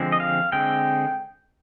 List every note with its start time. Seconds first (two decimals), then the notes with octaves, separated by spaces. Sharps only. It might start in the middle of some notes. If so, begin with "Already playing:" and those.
Already playing: D3 F3 G#3 C4
0.12 D#5
0.20 F5
0.52 D3 G#3 C4 G5